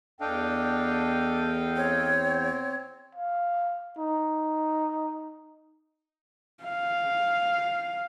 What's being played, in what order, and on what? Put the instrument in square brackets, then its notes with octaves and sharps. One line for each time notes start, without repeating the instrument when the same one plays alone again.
[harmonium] E2 G5 [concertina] D4 [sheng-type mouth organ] A4 D#5 F5
[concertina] C4 [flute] C#5
[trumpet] F5
D#4
[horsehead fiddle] F5